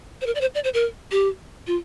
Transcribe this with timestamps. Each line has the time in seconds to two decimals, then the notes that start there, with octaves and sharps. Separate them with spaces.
0.21 C5
0.26 A#4
0.35 D5
0.41 C5
0.55 D5
0.64 C5
0.74 A#4
1.11 G4
1.67 F4